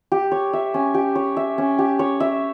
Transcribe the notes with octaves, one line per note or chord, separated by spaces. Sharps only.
G4
C#5
E5
C#4
G4
C#5
E5
C#4
G4
C#5
E5